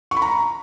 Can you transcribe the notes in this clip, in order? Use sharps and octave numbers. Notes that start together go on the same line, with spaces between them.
C#6
B5
A#5